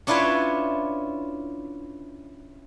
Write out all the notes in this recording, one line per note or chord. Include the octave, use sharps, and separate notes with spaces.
C#4 D4 E4 F4 B4 C#5